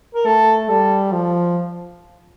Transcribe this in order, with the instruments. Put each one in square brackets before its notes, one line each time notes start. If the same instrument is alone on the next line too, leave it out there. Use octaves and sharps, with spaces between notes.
[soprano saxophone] A#4
[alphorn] A3 [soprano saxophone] A4
[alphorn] G3 [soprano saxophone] A4
[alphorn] F3